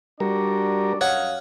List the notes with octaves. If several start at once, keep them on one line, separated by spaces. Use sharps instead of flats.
G3 D4 F#4 A#4 D5
F#2 C#5 D#5 F5 F#5